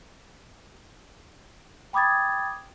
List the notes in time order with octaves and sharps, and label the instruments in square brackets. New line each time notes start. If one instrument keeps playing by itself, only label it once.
[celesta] G5 B5 D6 D#6 G#6 A6